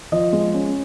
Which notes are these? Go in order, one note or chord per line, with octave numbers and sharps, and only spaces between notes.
F3 D#5
G#3
C#4